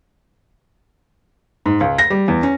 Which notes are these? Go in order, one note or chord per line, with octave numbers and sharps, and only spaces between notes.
G#2
C#2
A#6
G3
E2
C#4